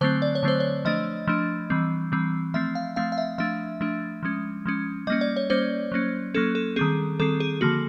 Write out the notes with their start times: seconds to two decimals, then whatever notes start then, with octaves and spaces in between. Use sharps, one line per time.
0.01 D3 F#3 A3 C4 C5
0.22 D5
0.35 C#5
0.43 D3 F#3 A3 C4 C5
0.60 C#5
0.85 F3 A3 D4 D#5
1.27 F3 A3 D4
1.70 E3 G3 C4
2.12 E3 G3 C4
2.54 F3 A3 C4 E5
2.75 F5
2.96 F3 A3 C4 F5
3.12 F5
3.18 E5
3.38 F3 A3 D4 E5
3.81 F3 A3 D4
4.23 F3 G#3 C#4
4.66 F3 G#3 C#4
5.07 G3 A#3 C#4 D#5
5.21 D5
5.36 C#5
5.50 G3 A#3 C#4 C5
5.92 F#3 A#3 C#4
6.34 F#3 A#3 C#4 A4
6.55 A4
6.76 D#3 G3 C4 G#4
7.20 D#3 G3 C4 A4
7.40 G#4
7.61 D3 F3 A#3 F#4